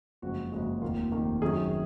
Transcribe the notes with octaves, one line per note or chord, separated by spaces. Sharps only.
F#1 F2 C#3 G#3 F#4
F#1 F2 C#3 G#3 F#4
F1 D#2 D#3 A#3 F4
F1 D#2 D#3 A#3
F#2 D#3 F#3 C#4 G#4